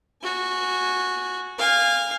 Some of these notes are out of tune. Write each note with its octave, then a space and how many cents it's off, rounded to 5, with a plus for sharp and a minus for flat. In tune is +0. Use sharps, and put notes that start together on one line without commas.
F#4 -10 G#5 +0
F5 -5 G#5 -30